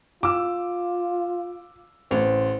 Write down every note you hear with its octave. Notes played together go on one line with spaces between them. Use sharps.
F4 D6 E6
A1 C5